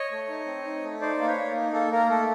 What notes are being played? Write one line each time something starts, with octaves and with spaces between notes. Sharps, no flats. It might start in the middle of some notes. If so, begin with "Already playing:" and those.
Already playing: C#5 D#5
A3
D#4
C4
D#4
A3
D#4 C5 D5
A#3
B4 C#5
A#3
D#4
A#3 A4
A#3 A#4
A3 A4